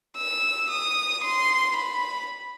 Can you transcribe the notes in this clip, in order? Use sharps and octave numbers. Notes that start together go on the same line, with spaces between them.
E6
D#6
C6
B5